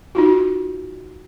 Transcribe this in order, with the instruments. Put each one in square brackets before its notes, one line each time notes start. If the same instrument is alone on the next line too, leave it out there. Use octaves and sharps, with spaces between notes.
[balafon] D#4 F4 F#4